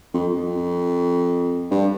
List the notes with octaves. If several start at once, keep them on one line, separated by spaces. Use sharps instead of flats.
F2
F2
G2